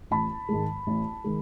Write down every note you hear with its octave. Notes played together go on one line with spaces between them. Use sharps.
A1 A5 B5
G#2 D#3 G#3
A1
D#3 G#3